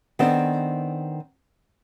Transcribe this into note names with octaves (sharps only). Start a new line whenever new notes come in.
D#3 B3 C4 D4 A4 C5